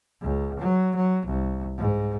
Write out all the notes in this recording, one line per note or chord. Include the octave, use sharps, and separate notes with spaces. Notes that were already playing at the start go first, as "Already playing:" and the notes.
C#2
F#3
F#3
C2
G#2